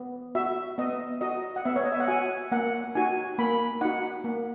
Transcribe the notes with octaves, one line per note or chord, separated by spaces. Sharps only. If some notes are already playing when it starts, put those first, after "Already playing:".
Already playing: B3
F#4 E5
B3 D#5
F#4 D#5
F#5
B3 E5
C#5
D#5
E5
F#5
F#4 G#5
A#3 F#5
D#4 F#4 G#5
A#3 B5
D#4 F#4 F#5
A#3